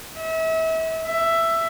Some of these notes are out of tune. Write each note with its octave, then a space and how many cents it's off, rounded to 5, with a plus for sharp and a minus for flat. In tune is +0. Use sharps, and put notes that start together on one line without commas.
E5 -35
E5 +10